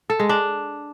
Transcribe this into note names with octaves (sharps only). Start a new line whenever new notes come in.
A4
G#3
D4